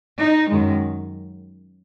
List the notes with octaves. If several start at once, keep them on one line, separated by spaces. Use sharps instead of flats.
D#4
F#2 D#3 G#3